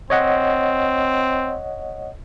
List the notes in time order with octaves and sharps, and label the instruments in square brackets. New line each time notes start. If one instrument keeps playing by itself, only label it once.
[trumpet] C4 [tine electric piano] C#5 D#5 F#5